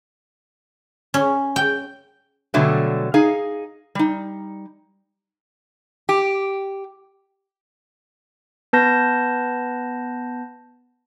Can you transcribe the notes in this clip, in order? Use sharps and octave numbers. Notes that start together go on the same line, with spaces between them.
C#4
G5
B2 D3 F#3 G3 A3
D#4 G#4 F5
G3 D#4
G4
B3 B4 A5 G6 A#6